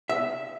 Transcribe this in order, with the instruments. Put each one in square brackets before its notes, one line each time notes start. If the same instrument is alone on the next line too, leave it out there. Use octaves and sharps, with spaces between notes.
[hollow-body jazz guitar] E5